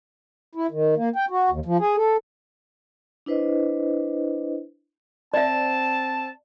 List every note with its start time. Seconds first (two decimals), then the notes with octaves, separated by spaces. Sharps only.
0.55 E4
0.71 D#3
0.97 A#3
1.16 G5
1.30 F#4
1.50 D#2
1.66 F3
1.80 G#4
1.97 A4
3.26 D4 E4 B4 C5 D#5
5.34 C4 D5 E5 A5